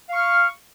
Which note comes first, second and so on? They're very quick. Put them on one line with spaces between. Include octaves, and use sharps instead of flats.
F5 C#6 F6